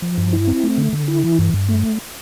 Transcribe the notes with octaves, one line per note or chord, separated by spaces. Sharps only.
F3
G2
E4
C4
A3
D3
D3
E4
E3
G2
G2
A3